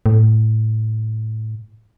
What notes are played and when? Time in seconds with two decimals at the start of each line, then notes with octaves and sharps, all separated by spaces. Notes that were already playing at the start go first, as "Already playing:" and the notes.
0.06 A2